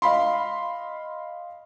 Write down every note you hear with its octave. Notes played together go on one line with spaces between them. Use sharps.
D#5 F5 B5 C6